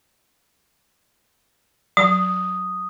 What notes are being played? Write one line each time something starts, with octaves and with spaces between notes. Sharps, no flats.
F#3 D#6